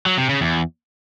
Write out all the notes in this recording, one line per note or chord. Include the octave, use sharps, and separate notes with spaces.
F#3
C3
C#3
E2